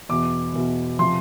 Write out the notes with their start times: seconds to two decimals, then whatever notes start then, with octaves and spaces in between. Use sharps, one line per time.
0.09 E2 B2 D6
0.54 E2 B2
0.99 C3 F3 C6